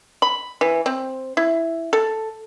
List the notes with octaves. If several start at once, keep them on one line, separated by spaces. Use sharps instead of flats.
B5
E3
C4
E4
A4